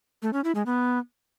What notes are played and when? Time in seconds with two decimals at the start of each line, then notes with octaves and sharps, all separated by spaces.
0.22 A3
0.33 C#4
0.44 E4
0.55 G#3
0.66 B3